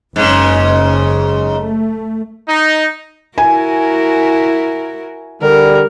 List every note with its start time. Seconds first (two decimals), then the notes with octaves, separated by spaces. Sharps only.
0.16 F#1 G#2 C#3
1.50 A3
2.48 D#4
3.38 E4 F#4 A#4 G#5
5.42 D3 G3 A#4